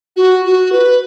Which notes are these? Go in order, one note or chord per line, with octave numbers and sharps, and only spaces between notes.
F#4
F#4
B4